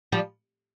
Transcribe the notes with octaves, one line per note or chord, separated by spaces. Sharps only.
F3 G3